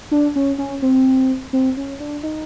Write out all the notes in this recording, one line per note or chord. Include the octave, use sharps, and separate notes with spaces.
D4
C#4
C#4
C4
C4
C#4
D4
D#4